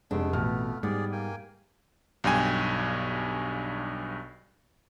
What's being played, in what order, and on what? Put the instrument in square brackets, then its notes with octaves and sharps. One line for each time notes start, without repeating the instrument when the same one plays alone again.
[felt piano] F1 [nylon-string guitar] G#3 C4 D4 [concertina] A3 B3
[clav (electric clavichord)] A1 B2 [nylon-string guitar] F2 [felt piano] F6
[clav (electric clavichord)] G#2 [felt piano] G3 [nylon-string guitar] B3 [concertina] G#4 D5
[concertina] A#3 G5 G#5
[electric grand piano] B1 G2 G5 G#5